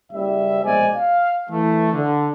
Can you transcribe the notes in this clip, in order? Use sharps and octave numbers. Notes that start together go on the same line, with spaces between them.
F#1 G3 E5
A#1 B2 G#3 C5 D5 G#5
F5
E3 A3
D3